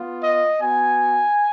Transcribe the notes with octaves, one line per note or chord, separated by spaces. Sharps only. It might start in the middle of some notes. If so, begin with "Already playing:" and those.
Already playing: B3 F4
D#5
B3 F#4 G#5